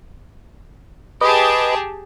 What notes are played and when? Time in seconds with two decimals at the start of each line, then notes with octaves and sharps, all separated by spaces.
1.21 G4 G#4 B4 D#5 A5